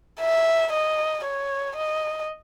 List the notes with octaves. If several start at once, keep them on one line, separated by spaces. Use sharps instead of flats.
E5
D#5
C#5
D#5